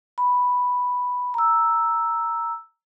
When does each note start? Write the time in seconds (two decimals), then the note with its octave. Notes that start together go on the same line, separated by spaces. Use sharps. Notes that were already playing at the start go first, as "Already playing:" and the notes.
0.18 B5
1.34 A#5 E6